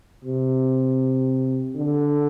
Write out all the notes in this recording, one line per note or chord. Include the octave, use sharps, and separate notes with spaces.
C3
D3